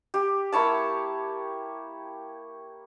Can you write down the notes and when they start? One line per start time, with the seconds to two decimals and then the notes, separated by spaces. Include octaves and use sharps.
0.14 G4
0.52 A#3 E4 C#5 A5